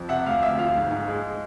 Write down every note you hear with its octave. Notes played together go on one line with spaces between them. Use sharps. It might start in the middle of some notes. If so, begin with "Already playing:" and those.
Already playing: F2
C3 E5 F#5
D2 F5
D2 E5
F3 F5
G#2
G#2
G#3